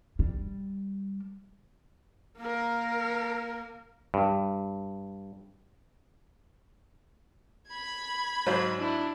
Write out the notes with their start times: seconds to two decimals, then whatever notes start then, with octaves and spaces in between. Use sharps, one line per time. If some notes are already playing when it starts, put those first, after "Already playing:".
0.19 G3
2.38 A#3 A#4
4.14 G2
7.68 B5 G#6
8.46 G#2 F#3 C5
8.78 D4 E4